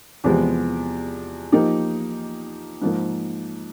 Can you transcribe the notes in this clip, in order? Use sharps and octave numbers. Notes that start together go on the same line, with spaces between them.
E2 C3 F3 G#3 B3
F3 A#3 D#4 G4
G#2 F3 A#3